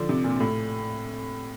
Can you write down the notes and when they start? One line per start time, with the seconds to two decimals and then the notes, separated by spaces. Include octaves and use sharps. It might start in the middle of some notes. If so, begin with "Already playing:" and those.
Already playing: D3 F3
0.09 C3
0.24 A#2
0.40 A2